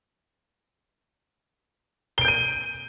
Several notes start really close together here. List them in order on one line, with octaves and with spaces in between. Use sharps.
G7 D7 G6 D#7